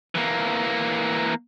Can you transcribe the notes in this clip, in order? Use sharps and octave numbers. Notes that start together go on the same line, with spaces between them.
E3 A#3